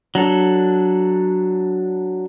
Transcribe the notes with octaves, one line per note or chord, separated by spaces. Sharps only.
F#3 D4 A4